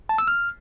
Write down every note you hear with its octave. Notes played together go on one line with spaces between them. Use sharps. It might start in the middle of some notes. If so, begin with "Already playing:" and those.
A5
E6
F6